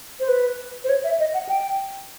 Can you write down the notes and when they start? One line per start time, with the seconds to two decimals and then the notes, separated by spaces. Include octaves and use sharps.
0.20 C5
0.28 B4
0.84 C5
0.89 C#5
1.04 E5
1.19 D#5
1.34 F#5
1.49 G5